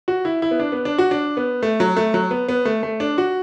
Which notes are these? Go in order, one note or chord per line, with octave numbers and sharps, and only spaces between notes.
F#4
E4
E4
B3
D4
B3
D4
F#4
D4
B3
A3
F#3
A3
F#3
B3
B3
A3
A3
D4
F#4